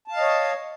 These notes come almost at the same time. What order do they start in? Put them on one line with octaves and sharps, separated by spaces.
A5 F5 D#5 C#5